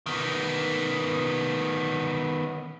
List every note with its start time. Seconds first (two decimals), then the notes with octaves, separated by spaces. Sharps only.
0.06 D#3 B3